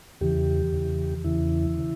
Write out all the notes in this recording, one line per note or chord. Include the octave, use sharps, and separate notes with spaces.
E2 C#3 E3 G4
E2 C#3 E3
E2 C#3 E3 E4
C#3 E3